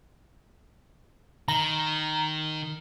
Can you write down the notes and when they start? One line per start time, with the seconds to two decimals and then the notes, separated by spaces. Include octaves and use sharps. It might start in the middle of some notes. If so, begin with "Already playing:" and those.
1.48 D#3 A#5